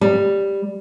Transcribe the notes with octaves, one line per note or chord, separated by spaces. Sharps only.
G3